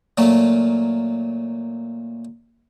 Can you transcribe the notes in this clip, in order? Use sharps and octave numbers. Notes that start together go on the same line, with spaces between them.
A#2 F#3 A3 A#3